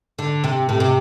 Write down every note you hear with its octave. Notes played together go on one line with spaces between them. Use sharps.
D3
C3
A2
C3